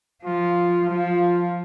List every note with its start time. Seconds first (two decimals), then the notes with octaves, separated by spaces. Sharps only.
0.25 F3 F4
0.89 F3 F4